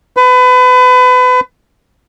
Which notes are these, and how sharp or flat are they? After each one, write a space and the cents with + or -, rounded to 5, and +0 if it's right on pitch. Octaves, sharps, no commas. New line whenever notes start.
B4 +30